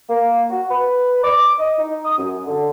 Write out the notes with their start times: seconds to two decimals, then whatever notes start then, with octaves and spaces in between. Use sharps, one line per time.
0.09 A#3
0.50 F#4
0.70 B4
1.24 D6
1.58 D#5
1.78 D#4
2.04 D#6
2.18 F#2
2.47 D3